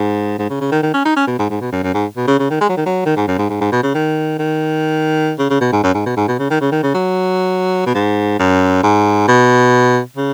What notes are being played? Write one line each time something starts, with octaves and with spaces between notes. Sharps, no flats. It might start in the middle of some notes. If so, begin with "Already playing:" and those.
Already playing: G#2
G#2
C#3
C#3
D#3
D#3
C#4
D#4
C#4
B2
G#2
G#2
B2
F#2
F#2
G#2
B2
C#3
C#3
D#3
G#3
F#3
D#3
F#3
D#3
G#2
F#2
G#2
G#2
G#2
B2
C#3
D#3
D#3
C#3
C#3
B2
G#2
F#2
G#2
B2
G#2
B2
C#3
D#3
C#3
D#3
C#3
F#3
B2
G#2
F#2
G#2
B2
C#3